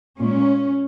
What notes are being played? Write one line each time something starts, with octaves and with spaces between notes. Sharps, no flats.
A#2 G#3 C#4